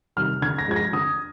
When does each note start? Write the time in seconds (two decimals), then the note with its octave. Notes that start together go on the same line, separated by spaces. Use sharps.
0.16 C3 D#3 G3 F6
0.42 D3 G#6
0.58 A#6
0.68 F3 G#3 G#6
0.76 A#6
0.93 D3 D#6